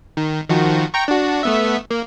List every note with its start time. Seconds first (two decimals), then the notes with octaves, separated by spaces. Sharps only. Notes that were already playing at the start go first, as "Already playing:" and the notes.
0.17 D#3
0.49 D#3 F3 F#4
0.94 G5 A#5 C#6
1.08 D4 F#4
1.43 A3 B3 E5
1.90 A#3